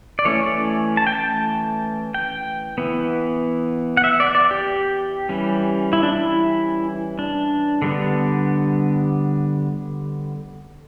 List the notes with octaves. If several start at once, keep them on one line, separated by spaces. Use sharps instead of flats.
D5
E3 A3 C#4 C#5
D5
A5
G5
A5
G5
E3 B3
F#5
E5
D5
D5
G4
E3 G3 C#4
E4
D4
E4
D4
D3 G3 B3